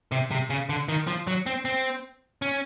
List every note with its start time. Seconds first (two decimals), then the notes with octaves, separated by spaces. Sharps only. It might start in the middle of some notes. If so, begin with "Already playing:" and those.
0.12 C3
0.31 C3
0.50 C#3
0.69 D3
0.89 D#3
1.07 F3
1.27 F#3
1.46 C4
1.65 C4
2.42 C#4